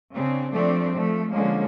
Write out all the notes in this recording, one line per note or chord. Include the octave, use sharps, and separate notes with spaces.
C#3 C4 D4
F3 A3 C4 D4 D5
F3 A3
D3 F3 G#3 A#3 C#4